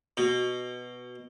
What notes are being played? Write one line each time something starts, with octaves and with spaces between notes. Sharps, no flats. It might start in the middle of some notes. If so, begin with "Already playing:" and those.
B2